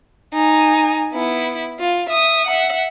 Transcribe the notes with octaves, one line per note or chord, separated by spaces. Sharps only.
D#4 G#5
B3 E4
F4
E5 D#6
E5 F#5